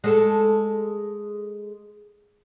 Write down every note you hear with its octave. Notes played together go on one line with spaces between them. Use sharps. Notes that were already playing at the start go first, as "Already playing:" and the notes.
G#3 A4